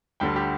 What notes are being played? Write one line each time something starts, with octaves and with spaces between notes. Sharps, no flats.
D2 D3 G3 G5
G4